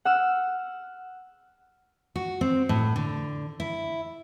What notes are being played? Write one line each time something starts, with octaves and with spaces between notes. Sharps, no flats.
F#5 E6 F6
F#4
C4
A2
D3
E4